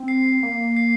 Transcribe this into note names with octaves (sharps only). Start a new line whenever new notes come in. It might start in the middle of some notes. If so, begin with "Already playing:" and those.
Already playing: C4
C7
A#3
C7